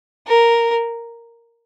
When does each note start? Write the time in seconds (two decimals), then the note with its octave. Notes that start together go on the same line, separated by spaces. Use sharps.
0.27 A#4